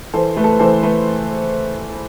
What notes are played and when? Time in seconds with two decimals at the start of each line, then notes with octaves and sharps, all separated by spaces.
0.14 E3 A4 C5
0.37 A3 B4
0.44 A4
0.51 B4
0.60 E3 A4 C5
0.83 A3 B4